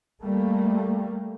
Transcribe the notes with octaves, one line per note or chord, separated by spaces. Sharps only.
G3 A3 A#3